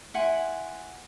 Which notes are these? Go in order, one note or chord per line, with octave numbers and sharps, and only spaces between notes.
E4 F#5 G#5 C6